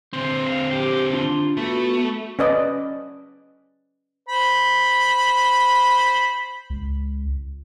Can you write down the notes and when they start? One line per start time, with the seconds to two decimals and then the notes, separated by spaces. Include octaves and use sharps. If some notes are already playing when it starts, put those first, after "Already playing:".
0.13 D3 C4 C5
0.47 F5
0.71 G4 G5
1.13 D4 F4 C6
1.57 A3 B3 F#4
2.39 C#4 B4 D5 D#5
4.29 C5 B5
6.70 C#2